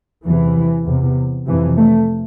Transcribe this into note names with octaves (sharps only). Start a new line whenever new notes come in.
E2 C3 E3
E2 C3
F2 C3 E3
A3